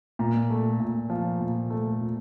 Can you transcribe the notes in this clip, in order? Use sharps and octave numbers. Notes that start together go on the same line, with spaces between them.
A#2
A3
A#2
F3
A#2
A3
A#2